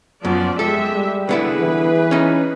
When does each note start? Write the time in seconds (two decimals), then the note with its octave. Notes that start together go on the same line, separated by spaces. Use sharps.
0.25 F#2 F3 B3 D5
0.59 G#3 G4 A4 E5
0.94 G3
1.29 D3 B3 E4 G#4 B4
1.59 E3
2.11 C#4 D#4